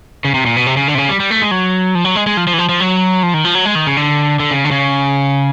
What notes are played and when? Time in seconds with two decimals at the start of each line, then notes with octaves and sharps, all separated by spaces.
0.25 C#3
0.34 C3
0.46 A#2
0.57 B2
0.67 C3
0.77 C#3
0.88 D3
0.95 C3
0.98 C#3
1.09 G3
1.20 G3
1.31 A3
1.42 G#3
1.51 F#3
1.95 F3
2.05 F#3
2.16 G#3
2.27 G#3
2.37 F3
2.47 F3
2.54 E3
2.58 F3
2.69 F3
2.80 F#3
3.23 F3
3.34 D#3
3.44 F3
3.55 F#3
3.65 G#3
3.75 D#3
3.87 C#3
3.97 D3
4.40 D3
4.51 C#3
4.65 D3
4.71 C#3